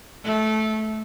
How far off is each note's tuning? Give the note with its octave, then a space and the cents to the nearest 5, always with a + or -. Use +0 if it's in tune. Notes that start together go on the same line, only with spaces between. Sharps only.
A3 -15